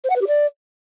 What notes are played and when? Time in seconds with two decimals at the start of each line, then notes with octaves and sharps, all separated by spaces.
0.04 C5
0.10 F#5
0.16 B4
0.21 G4
0.27 D5